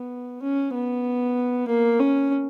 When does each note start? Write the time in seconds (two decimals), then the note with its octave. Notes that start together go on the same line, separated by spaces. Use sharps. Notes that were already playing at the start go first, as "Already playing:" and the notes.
Already playing: B3
0.42 C#4
0.74 B3
1.68 A#3
2.00 C#4